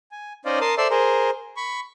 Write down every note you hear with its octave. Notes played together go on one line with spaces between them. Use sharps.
G#5
C#4 D#4 C5 D5 D#5 F5
A#4 A5 C6 D#6
A4 C5 D5 E5 C6 E6
G#4 A#4 C5
B5 C#6